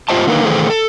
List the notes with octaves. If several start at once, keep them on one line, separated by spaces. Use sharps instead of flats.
G#2 F4 G4 C5 D#5 A5
D3 D#3 A#3 D#4 A#4 B4
D#3 E3 A3 G#4 A4 C5
A4